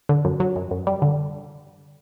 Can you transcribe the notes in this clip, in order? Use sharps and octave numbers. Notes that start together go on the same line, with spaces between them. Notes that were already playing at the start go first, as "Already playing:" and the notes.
D3
F#2
F#3
F#2
F#2
G3
D3